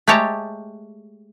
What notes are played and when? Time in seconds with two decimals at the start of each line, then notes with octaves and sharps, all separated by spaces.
0.07 G#3 A3 G4 C#5 A5 A#5